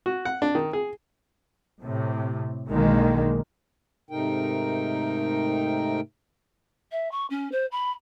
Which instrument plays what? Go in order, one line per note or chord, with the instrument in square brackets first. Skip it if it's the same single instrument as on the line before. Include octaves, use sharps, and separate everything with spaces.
[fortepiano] F#4
F#5
D4
D#3
G#4
[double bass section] A2 C3
B1 D3 D#3 G#3 A#3
[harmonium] G#2 C3 A3 D#4 A#4 G5
[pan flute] E5
C#6
C#4
C5
B5